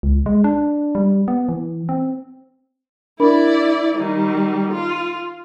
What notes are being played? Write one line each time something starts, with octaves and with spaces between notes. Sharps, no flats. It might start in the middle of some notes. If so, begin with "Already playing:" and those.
C#2
G#3
D4
G3
B3
E3
C4
D4 E4 A#4 D5 B5
D#3 G3
F4